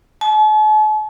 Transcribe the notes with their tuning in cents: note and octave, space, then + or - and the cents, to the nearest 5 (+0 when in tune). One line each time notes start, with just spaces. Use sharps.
A5 -45